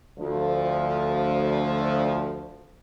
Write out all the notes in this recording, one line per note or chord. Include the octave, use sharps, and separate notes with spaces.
D2 F3